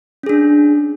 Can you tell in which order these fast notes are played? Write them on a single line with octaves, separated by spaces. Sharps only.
C#4 G#4 D4